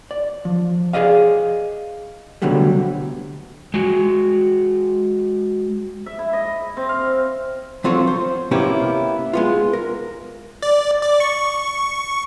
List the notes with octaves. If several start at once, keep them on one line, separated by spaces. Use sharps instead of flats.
D5
F3
G#4 A4 D5 D#5 F5
C2 B2 D3 F#3 G3 A3
G#3 F#4
E5
E4
D#5
C4
F5
F3 F#3 C4 F4 A4 C#5
C5
C3 A#3 B3 C#4 E4 G4
G#3 B3 F4
A#4
D5
D5
C#6